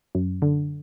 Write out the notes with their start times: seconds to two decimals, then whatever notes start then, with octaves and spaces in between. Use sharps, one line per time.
0.15 F#2
0.42 D3